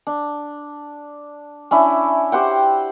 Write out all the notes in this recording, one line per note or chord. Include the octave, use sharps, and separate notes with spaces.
D4
C#4 D4 E4 E5
G4 C5 F#5 G5